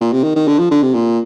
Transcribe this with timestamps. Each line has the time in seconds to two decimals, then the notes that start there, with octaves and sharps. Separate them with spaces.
0.01 A#2
0.13 C3
0.24 D#3
0.36 D#3
0.48 D3
0.59 F3
0.71 D3
0.83 C3
0.94 A#2